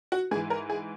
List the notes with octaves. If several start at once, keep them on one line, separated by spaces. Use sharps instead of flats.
F#4
G#2 E3 G#4
A#4
G#4